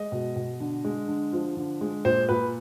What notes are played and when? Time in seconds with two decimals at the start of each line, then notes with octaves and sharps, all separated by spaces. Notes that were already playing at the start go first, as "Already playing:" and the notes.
Already playing: G#3 D#5
0.12 B2
0.36 B2
0.60 D3
0.85 G#3
1.08 D3
1.33 F3
1.57 D3
1.81 G#3
2.05 A#2 C5
2.29 A#2 B4